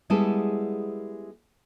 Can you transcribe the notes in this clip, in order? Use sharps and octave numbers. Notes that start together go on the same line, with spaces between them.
G3 G#3 B3 E4 G#4 A4